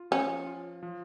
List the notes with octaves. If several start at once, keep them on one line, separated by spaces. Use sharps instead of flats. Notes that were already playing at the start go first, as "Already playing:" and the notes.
Already playing: F4
F3 C#4
F4
F3